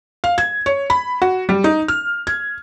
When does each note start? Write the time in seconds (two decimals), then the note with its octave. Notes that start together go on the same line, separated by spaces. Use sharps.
0.24 F5
0.38 G#6
0.66 C#5
0.90 B5
1.22 F#4
1.49 G3
1.64 D#4
1.88 F6
2.27 G#6